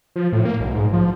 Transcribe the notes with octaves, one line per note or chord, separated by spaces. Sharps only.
F3
A2
A#3
B1
G#2
F3